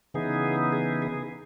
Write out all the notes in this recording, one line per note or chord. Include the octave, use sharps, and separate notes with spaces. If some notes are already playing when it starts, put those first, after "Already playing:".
C#3 E3 B3 D#4 G#4
G#4
G#4